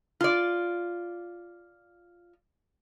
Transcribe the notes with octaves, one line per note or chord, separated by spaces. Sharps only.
F4 D5